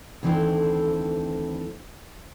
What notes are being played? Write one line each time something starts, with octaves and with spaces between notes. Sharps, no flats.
D2 D#3 E3 C4 E4 A4